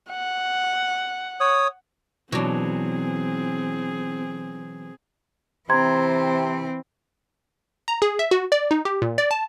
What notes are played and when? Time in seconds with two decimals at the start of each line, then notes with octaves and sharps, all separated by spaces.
0.11 F#5
1.40 C#5 D#6
2.32 B2 E3 F#3 C4 D4 G#4
5.69 C3 E3 C4 A#5 C6 G#6
7.88 A#5
8.02 G#4
8.19 E5
8.31 F#4
8.52 D5
8.71 D#4
8.85 G4
9.02 A#2
9.18 D5
9.31 A5